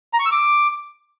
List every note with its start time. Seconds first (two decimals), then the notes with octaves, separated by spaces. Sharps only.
0.13 A#5
0.19 C#6
0.25 E6
0.32 D6